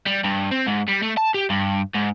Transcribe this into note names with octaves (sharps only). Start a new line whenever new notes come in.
G3
G2
C4
G#2
G3
A3
A5
G4
G2
G#2